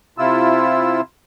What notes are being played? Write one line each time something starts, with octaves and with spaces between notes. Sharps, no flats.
C3 E4 F4 E6